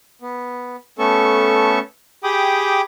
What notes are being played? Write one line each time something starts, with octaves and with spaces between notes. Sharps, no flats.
B3
A3 B3 C#4 A4 C#6
G4 G#4 G5 B5 D6 D#6